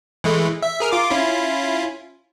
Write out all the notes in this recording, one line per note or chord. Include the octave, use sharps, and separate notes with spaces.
E3 G#3 A3
E5
G#4 A#4 F6
F4 D6
C#4 E4 F4